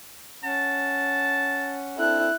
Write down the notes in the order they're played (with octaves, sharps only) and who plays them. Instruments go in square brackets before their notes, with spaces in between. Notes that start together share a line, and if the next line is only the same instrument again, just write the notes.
[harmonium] C#4 F#5 [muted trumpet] A5
[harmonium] C4 D4 A4 [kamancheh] E4 F#6